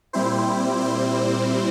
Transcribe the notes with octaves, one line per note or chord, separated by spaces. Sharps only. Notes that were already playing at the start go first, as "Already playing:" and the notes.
A#2 G3 C4 E4 C5
C5